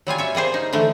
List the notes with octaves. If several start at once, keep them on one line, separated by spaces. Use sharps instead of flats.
F#3 G3 F4 G#5
C#5 E5
G3 A#3 G#4 C5
D#4
D3 E3 A3